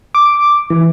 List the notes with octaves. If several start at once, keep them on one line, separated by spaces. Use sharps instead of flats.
D6
E3